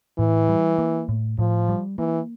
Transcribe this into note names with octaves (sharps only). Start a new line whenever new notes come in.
A2 E3
G3
A#3
A2
A2 F3
G3
E3 A#3